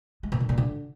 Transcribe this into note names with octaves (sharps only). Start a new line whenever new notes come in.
G#3
A#2
D3
A#2
D3